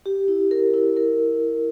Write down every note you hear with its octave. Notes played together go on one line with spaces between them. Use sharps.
G4
E4
A#4
E4
A#4